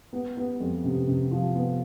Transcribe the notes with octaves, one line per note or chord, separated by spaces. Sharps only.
B3
B3
F2
C3
C3
F3
B3